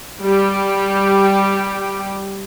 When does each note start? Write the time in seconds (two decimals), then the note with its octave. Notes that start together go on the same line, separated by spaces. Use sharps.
0.24 G3 G4